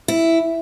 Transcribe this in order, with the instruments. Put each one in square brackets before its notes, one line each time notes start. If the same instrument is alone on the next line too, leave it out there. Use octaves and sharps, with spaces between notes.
[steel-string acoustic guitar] E4